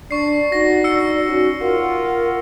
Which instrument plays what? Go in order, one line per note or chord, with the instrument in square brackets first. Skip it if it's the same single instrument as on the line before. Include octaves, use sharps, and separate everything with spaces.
[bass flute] D4 [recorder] D5 [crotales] C#6 C7
[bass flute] D#4 [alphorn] F#4 [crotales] A#6
[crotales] E6 C#7
[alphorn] C#4 [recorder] F#4
[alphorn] F4 [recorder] A#4 [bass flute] F#5